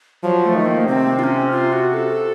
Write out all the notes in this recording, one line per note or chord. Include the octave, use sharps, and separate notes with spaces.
F3 F#3
A3
D#3
A#3
C3 C4
F4
C#4
F4
F#4
A4